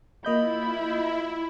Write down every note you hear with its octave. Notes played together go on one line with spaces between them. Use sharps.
A#3 E4 F4 D#5 B5 G6